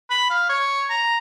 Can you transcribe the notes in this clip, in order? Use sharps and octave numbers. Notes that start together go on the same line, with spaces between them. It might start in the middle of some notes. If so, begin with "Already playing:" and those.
B5
F5
C#5
A#5